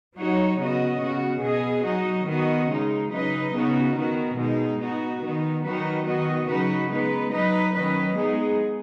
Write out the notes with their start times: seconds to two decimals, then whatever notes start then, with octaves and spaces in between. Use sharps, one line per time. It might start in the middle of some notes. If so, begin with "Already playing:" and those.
0.17 F#3 D#4 F#4 C#5
0.59 C#3 B3 F#4 D#5
1.01 C#3 B3 F#4
1.42 B2 B3 G#4 D#5
1.85 F#3 D#4 F#4 D#5
2.27 D#3 B3 F#4 D#5
2.70 C#3 G#3 D#4
3.11 C#3 F#3 D#4 B4 D#5
3.53 C#3 B3 D#4 F#4
3.96 D#3 B3 F#4
4.37 B2 G#3 D#4
4.79 B3 D#4 F#4
5.22 D#3 B3 D#4
5.63 D#3 F#3 D#4 F#4 B4
6.05 D#3 B3 F#4 D#5
6.48 C#3 F#3 D#4 F#4 B4
6.90 G#3 B3 D#4 B4
7.31 F#3 D#4 B4 D#5
7.74 D#3 F#3 C#4 B4 D#5
8.16 G#3 B3 D#4 G#4